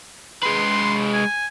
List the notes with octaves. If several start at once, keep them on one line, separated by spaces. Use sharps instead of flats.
G#3 B4 C6
G#5